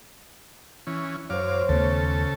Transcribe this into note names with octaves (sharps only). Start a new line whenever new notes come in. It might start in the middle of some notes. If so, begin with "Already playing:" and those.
E3 C#4
F#2 C5 C#5 F5 D6
D#2 C#3 A3 B3 A4